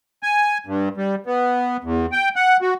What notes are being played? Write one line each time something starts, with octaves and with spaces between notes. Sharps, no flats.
G#5
G2
G3
B3
E2
G5
F#5
F#4